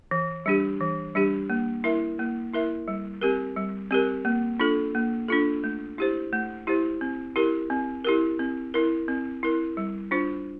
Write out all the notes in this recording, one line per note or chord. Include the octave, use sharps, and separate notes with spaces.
E3
G3 D4 G4
E3
G3 D4 G4
A#3
E4 A#4 E5
A#3
E4 A#4 E5
G3
C4 G4 A#4
G3
C4 G4 A#4
A#3
D4 F4 A4
A#3
D4 F4 A4
A3
E4 G4 C5
A3
E4 G4 C5
C4
E4 G4 A#4
C4
E4 G4 A#4
C4
E4 A#4
C4
E4 A#4
G3
D4 F4 C5